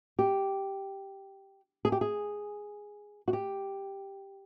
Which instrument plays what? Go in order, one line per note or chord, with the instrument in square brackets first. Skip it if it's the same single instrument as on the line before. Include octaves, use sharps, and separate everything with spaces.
[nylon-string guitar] G4
G#4
G4
G#4
F#4
G4